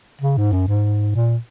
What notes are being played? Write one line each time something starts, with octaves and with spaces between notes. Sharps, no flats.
C#3
G#2
F#2
G#2
A#2